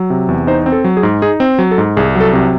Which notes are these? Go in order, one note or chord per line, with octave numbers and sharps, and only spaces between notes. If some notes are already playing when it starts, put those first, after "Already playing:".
Already playing: F#3
C3
E2
D#4 C5
C4
A4
F#3
G#4
G#2
D#4 G#4
C4
F#3
A4
G#2
C2 G#4
F#3 A4
C3